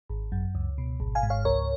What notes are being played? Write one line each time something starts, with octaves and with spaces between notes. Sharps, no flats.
G#1
F#2
C#2
B2
G#1
F5 G#5
G#2
C#5 F5
C#2 A#4 C#5